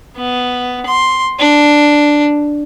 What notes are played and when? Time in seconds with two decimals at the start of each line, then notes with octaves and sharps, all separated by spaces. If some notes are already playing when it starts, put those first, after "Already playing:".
0.17 B3
0.86 C6
1.39 D4